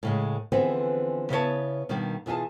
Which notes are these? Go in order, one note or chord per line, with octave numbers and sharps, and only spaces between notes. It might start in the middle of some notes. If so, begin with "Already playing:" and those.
A2 C#3 G#3
D3 E3 F3 B3 C4 G#4
C#3 B3 E4 G#4 C#5 A5
B2 D#3 G3 A#3 D4 G4
B2 E3 F4 G#4 A5